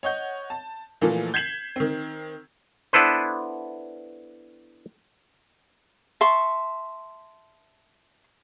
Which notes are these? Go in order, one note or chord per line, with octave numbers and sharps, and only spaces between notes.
C#5 D#5 F#5 G6
A5
A#2 E3 F3 A3 A#3
G6 G#6 B6 C7 E7 F#7
D#3 C4
B3 D4 E4 A4 B4 C5
E5 A5 C6 C#6